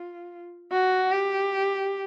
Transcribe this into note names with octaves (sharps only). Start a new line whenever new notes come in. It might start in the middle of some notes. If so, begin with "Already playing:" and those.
Already playing: F4
F#4
G4